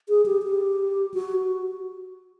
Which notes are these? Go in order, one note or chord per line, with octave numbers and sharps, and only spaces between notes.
G#4
G4
G4
F#4